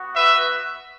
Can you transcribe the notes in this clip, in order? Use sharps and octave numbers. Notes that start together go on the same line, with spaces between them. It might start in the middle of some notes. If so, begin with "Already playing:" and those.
Already playing: B3 F#4
B4 E5